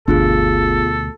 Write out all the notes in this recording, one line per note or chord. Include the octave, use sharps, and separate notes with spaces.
G1 D2 B2 B3 D4 F4 G#4 A4